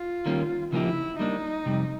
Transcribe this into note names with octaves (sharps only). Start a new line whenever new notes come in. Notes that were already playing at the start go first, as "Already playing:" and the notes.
Already playing: F4
D#3 G3 A#3 C#4
C#3 F3 A#3 D#4 E4 G4
G3 A#3 D4 D#4
F2 C3 G3